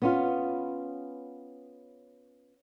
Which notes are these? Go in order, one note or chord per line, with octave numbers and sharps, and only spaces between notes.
B3 C#4 F4